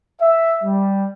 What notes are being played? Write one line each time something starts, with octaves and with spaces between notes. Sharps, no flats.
E5
G3